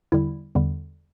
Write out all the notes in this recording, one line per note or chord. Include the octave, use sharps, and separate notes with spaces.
E2 D3 G3 E4
E2 D3 G3